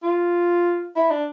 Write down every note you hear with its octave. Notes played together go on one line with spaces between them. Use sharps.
F4
E4
D4